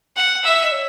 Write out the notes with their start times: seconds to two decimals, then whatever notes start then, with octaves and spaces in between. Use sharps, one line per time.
0.16 F#5
0.44 E5
0.62 D#5
0.72 C#5